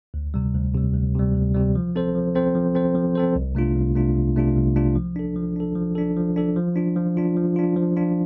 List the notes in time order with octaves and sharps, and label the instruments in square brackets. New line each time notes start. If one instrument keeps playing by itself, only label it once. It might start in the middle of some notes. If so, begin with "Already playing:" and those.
[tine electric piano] D2
C3 G3
D2
C3 G3
D2
C3 G3
D2
C3 G3
F3
C4 A4 C5
F3
C4 A4 C5
F3
C4 A4 C5
F3
C4 A4 C5
C2
C3 A3 D4 F4
C2
C3 A3 D4 F4
C2
C3 A3 D4 F4
C2
C3 A3 D4 F4
F3
D4 A4
F3
D4 A4
F3
D4 A4
F3
D4 A4
F3
D4 F4
F3
D4 F4
F3
D4 F4
F3
D4 F4